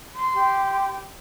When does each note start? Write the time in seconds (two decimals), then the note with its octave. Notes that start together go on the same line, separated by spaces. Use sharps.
0.14 C6
0.34 G4